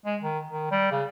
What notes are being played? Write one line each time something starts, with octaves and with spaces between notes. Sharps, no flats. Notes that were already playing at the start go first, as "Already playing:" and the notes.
G#3
D#3
D#3
G3
C#3